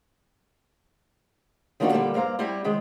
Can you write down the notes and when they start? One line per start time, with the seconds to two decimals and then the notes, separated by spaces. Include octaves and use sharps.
1.80 D#3 F3 A#3 D4 D#4 F#4
1.92 A#2 D3 G3 A#3 G4 A4
2.14 G2 A#3 C5 F5 A#5
2.39 G3 C4 E4 G4
2.64 C3 D#3 G#3